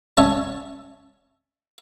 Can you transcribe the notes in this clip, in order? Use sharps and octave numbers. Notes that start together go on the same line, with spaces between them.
C#4 C#5 E5 A5